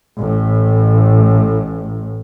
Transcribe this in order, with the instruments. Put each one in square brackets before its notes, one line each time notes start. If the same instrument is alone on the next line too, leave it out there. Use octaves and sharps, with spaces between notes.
[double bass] A1 A2